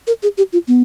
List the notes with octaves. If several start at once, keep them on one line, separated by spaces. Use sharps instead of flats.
A#4
G#4
G4
F4
B3